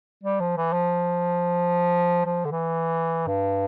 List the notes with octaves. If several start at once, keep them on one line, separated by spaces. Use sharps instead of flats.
G3
F3
E3
F3
F3
D3
E3
G2